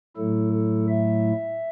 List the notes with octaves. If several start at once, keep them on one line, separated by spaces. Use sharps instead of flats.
A2 F#3 A3 E4 A4
A4
E5